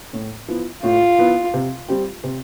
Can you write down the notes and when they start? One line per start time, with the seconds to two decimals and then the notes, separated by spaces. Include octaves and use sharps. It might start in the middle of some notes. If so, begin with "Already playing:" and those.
0.13 A2
0.48 F3 B3 E4
0.83 A2 F4
1.18 F3 B3 E4
1.54 C3
1.88 G3 C4 G4
2.24 C3